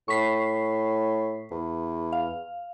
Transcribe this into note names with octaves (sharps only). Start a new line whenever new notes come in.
A2 C#6 B6 C7
E2
F5